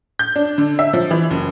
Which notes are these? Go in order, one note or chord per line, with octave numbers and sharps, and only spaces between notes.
G6
D4
D3
E5
F3
E3
F#1